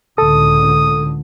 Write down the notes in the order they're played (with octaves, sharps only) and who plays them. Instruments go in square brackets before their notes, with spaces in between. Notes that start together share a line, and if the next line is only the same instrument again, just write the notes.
[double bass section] C#2 A2 D3 [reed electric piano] A4 [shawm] D#6